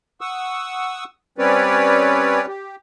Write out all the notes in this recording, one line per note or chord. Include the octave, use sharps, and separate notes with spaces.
F#5 C#6 D#6 E6
G3 C4 C#4 B4 C#5 D5
G4